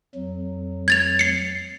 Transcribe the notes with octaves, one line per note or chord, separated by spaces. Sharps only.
F2 F#3
G#6 A6 F7
C7 C#7